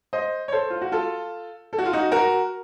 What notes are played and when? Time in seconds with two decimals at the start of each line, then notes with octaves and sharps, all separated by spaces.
0.13 C5 D#5
0.48 C#5
0.52 A4 C5
0.70 F4
0.82 F#4
0.92 F4 A4
1.73 A4
1.79 F#4
1.86 F4
1.93 D#4 F#4
2.12 F#4 A#4